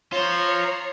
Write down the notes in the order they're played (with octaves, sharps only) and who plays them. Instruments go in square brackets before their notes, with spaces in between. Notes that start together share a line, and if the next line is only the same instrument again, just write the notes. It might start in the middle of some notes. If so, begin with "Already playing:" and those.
[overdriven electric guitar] F4 C5 [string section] C#5 A#5 C7